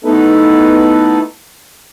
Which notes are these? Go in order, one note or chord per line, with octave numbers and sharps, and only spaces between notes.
A3 B3 D#4 E4 A4 B4